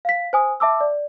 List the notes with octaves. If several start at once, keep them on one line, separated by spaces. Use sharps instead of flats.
F5 B6
C5 G#5 D#6
E5 A5 D6 E6
D5